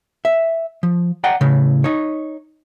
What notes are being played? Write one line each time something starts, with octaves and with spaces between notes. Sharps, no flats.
E5
F3
D5 F#5 G5 A#5
A2 C#3
D#4 C#5